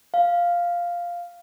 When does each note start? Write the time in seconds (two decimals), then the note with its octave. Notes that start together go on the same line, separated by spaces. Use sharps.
0.14 F5